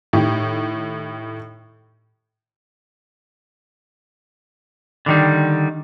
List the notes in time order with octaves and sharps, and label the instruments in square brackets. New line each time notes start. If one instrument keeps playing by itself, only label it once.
[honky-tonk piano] A2 D#3 G4
[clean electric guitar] D3 D#3 G3